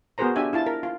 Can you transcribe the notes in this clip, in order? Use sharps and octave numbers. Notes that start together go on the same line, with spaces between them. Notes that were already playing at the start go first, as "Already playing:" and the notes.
B3 F#4 G#4 A#4 C5 A#5
D4 G4 E5 G#5
E4 F4 A5
A#4
F4